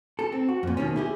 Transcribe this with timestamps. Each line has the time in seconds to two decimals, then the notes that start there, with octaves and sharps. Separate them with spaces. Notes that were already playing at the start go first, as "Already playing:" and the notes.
0.19 A4
0.32 C4
0.49 F#4
0.63 F2 A#2
0.77 D#2 B2 D#3 C#4
0.96 E4 G4 G#4